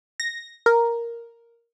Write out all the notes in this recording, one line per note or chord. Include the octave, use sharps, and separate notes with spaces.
A#6
A#4